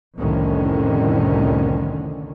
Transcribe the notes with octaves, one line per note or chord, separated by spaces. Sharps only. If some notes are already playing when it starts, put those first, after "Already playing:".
C2 F2 A2 D3 D#3 C#4